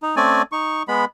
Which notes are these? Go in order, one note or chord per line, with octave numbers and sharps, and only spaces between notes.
D#4
A3 C4 C#4 D5 G#5
D#4 C#6
G#3 B3 B5